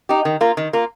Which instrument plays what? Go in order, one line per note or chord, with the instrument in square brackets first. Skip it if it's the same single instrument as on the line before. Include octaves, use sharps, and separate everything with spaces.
[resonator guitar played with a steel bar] D#4 G4
D#3
A#3 F4
D#3
A#3 F4